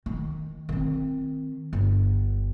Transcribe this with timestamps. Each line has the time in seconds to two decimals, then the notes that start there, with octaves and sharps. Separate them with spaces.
0.06 D#3
0.69 D#3 C4
1.73 G1